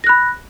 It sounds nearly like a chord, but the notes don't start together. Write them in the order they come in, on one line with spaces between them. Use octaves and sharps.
A#6 F#6 B5